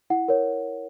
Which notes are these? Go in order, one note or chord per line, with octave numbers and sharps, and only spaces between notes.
E4 F#5
A#4 C#5